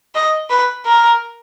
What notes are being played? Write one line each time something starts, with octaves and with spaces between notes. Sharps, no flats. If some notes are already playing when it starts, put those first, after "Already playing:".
D#5
B4
A#4